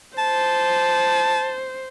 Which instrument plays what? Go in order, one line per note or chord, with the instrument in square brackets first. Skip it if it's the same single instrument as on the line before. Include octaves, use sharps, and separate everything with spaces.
[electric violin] C5 [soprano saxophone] A5